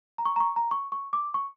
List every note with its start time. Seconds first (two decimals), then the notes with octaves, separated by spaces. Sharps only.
0.18 A#5
0.25 C#6
0.36 A#5
0.40 C#6
0.56 A#5
0.71 C#6
0.92 C#6
1.13 D6
1.34 C#6